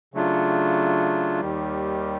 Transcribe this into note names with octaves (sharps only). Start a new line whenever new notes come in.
C#3 F#3 A3 D4 F4
D#2 D#3 G3